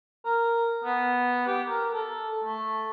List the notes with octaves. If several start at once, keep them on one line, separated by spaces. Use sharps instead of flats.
A#4
B3
G4
A#4
A4
A3